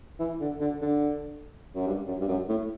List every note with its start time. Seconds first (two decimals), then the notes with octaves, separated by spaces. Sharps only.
0.19 E3
0.41 D3
0.60 D3
0.82 D3
1.75 F#2
1.87 G2
2.07 F#2
2.20 G2
2.28 F#2
2.49 A2